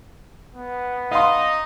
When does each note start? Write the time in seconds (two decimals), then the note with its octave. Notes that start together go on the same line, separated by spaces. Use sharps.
0.54 B3
1.11 D#4 D#5 F5 C6